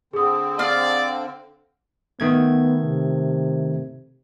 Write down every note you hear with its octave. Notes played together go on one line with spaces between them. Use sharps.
D3 C4 G#4 D#6
D5 F5
D#3 A3 B3 G#6
C3